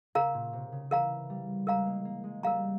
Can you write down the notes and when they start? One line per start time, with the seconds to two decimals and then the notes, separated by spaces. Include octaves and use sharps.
0.15 C#3 A#4 F5 A#5
0.34 A#2
0.53 C3
0.72 C#3
0.91 E3 A#4 F5 A#5
1.30 G3
1.67 G#3 A#4 F5 A#5
1.86 A#3
2.05 A#3
2.24 G#3
2.43 G3 A#4 F5 A#5